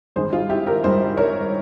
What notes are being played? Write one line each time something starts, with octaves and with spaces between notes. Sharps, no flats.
G#1 G2 G3 G#4 C5
F4 G#4
E4 G4
G4 A#4
G#1 G2 G3 G#4 C5
A#4 C#5